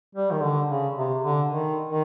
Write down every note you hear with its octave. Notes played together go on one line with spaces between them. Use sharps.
G3
D#3
D3
C#3
C3
D3
D#3
D#3